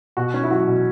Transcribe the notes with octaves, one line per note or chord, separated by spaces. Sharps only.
B2 F#4
C#4
E4
F#3 F#4
B2